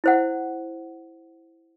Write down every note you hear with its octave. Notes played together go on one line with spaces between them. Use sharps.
E4 C5 F#5